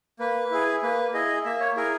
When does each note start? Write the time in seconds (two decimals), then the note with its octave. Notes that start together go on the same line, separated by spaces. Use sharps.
0.19 A#3 B4
0.51 E4 G#4
0.83 A#3 B4
1.14 E4 G#4 D#5
1.45 A#3 E5
1.60 C#5
1.76 E4 G#4 A#4